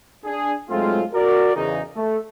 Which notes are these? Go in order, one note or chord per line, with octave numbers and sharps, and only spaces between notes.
D4 G#4
G#2 F#3 G#3 A3 C4 F4
F#4 A#4 D5
E2 C#3 D#4
A3